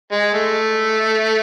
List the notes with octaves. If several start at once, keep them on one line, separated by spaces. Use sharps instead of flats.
G#3
A3